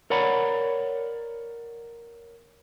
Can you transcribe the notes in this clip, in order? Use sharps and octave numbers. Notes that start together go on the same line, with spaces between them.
A#4 C#5 D5 F#5 A#5 B5